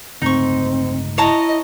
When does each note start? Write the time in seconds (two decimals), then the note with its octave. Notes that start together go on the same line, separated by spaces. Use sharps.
0.22 G1 C#2 A2 C4 D#4 C#6
1.18 E4 C#5 D#5 A5 A#5